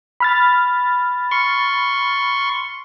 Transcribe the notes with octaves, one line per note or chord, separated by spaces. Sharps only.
B5 F6 A6
C6 C#6